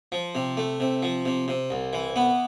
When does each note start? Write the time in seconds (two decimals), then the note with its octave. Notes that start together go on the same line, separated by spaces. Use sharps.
0.12 F3
0.35 C3
0.57 A3
0.80 C3
1.03 F3
1.25 C3
1.48 C3
1.70 C2
1.93 E3
2.16 B3